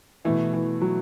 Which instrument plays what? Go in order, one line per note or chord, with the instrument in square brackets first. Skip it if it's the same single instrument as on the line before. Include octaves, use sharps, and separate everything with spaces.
[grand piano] B2 A3 E4 [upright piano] E3
[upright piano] E3
F#3